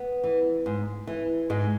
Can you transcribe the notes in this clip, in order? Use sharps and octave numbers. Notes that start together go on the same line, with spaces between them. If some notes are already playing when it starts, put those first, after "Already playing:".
Already playing: B3
E3
G#2
E3
G#2 G#3